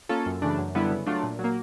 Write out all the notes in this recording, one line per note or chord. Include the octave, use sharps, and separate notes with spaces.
A#3 C#4 F4 A4
F#2
C#3 E3 A3 D4
F#2
D3 G3 B3 E4
C#3
F#3 A3 D4 F4
A#2
F#3
A#3